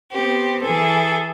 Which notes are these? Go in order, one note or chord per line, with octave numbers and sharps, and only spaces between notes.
B3 C4 G4
E3 G#4 A4